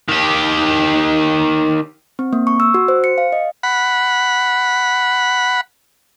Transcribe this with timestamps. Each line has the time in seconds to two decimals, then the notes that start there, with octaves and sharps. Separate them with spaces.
0.09 D#3 G4
2.19 C4
2.33 A#3
2.47 C#6
2.60 E6
2.74 F#4
2.88 C5
3.04 C#7
3.18 F5
3.32 D#5
3.63 F#5 B5